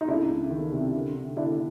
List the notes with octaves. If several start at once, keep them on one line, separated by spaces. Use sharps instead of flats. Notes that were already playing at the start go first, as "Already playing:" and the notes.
D#4
C#2 D4 E4
C#2
D#3
C3
D3
D3
D3 D4 E4